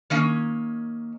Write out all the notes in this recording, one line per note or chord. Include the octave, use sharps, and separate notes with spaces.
D#3 A#3 C#4